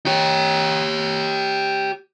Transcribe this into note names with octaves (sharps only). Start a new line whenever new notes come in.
G4 C#5